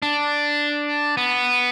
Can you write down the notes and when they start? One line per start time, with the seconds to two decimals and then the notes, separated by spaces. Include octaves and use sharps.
0.02 D4
1.17 B3